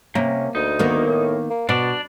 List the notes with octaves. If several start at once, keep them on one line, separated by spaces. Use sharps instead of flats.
C3 A#3 C#4
D2 D#4
D#3 A#3 B3
A2
A#3
B2 B3 D4 D5